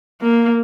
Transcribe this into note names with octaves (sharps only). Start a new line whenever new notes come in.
A#3